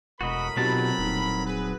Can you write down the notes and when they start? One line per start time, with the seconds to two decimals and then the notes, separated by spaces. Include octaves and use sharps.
0.21 E1 A2 F#4 A#4 D#5 B5
0.57 B2 F#3 C4 D#4 F4 G4 A5
0.99 D#1 D#4
1.46 G#4 B4